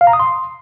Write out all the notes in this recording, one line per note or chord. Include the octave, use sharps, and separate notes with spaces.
F5
A#5
D#6
C6